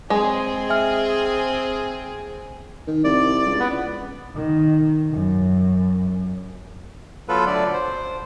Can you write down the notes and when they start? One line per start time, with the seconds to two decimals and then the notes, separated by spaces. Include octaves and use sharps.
0.10 G#3 C4 G#4
0.70 E5 G#5 F6
2.87 D#3
3.04 C2 D5
3.47 C#2
3.60 B3
4.36 D#3
5.12 F#2
7.29 F#3 B3 F4 A4 B4
7.46 D3 F#3 A3 D5
7.73 C5